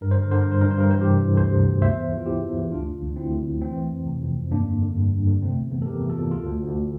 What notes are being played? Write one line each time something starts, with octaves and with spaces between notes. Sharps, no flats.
G2 A#4
C5
D3
A#4
D3 C5
A#4
G2
C5
G2 A#4
C5
G2 A#4
E3 C5
G4 A#4
C3
E3
D2 A4 C5
C3
D2
E2 C5 E5
E2
E3
F4
E2 E4 G4
E2
E3
D2 D4 F4
D3
D2
D2 C4 E4
D3
D2
E3 A3 C4
E3
F2
C3
F2
F2
G2 A#3 D4
D3
D3
G2
G2
D3
C3 A3 C4
E2
E2
A4
E2 G4 A#4
E3
F4 A4
E2
D2 F4 A4
D2
D2